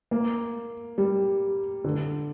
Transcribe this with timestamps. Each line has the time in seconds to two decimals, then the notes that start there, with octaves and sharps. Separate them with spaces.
0.11 A#3
0.98 G3
1.85 D3